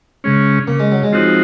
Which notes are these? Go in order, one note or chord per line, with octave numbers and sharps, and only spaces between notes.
C#3 G#3 C#4
C#3 A#3
G#3
F#3
G#3
F3 C4 D#4 F#4